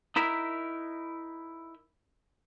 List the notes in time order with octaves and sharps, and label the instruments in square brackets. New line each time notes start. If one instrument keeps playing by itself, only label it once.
[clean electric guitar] D#4 E4 A#4 E5